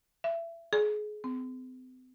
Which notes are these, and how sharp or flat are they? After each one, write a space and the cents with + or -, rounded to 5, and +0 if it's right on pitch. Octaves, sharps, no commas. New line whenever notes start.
E5 +25
G#4 +25
C4 -40